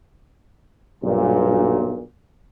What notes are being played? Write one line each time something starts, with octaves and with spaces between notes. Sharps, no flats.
B1 G2 A#2